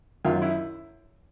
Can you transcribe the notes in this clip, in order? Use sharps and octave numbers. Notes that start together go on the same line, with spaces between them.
F#2 D#3 F#3 F4
E4